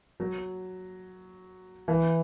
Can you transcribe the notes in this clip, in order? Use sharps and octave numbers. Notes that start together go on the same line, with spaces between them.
F#3
E3